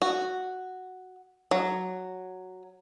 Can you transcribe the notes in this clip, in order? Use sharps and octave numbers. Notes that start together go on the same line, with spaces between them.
F#4
F#3